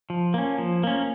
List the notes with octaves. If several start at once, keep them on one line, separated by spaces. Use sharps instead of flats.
F3
A#3 C#4
F3
A#3 C#4